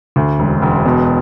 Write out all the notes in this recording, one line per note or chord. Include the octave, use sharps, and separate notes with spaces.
D2
E1
E1
B2